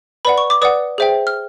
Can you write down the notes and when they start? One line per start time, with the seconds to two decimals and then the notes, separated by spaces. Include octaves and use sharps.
0.25 B4 D5 F#5 B5
0.38 C#6
0.50 D6
0.62 B4 D5 F#5 D#6
0.98 G#4 C5 E5 G5
1.27 F6